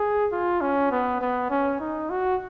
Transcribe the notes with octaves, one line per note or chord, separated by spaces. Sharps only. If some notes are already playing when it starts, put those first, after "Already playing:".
Already playing: G#4
F4
C#4
B3
B3
C#4
D#4
F#4